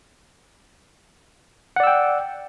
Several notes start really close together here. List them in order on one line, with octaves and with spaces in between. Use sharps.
F#5 D5 E6 G5